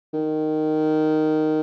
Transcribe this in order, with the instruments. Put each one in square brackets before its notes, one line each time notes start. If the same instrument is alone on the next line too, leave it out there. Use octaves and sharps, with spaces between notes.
[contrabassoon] D#3